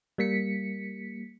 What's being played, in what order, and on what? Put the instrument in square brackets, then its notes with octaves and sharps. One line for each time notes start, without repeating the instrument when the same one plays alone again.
[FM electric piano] G3 A#3 B6 C#7